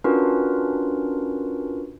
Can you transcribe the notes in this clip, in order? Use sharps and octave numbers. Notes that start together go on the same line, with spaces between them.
C#4 D4 F4 F#4 A#4 B4